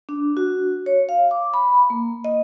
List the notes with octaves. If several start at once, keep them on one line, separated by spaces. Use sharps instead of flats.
D4
F#4
C#5
F5
D6
B5
A#3
D#5